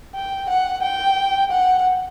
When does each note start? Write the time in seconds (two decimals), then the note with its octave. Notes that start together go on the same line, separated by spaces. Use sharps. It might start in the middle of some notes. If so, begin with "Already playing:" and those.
0.15 G5
0.49 F#5
0.83 G5
1.51 F#5